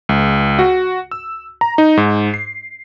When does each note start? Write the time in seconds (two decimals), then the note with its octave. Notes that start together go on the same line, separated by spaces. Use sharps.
0.09 C#2
0.59 F#4
1.11 E6
1.61 A#5
1.78 D#4
1.97 G#2
2.34 C7